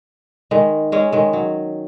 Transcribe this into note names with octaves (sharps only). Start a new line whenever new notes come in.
D#3 G#3
G#3 C#4
D#3 G#3
F#3